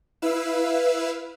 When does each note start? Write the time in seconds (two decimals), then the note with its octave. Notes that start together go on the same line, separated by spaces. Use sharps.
0.22 E4 B4 F5 E6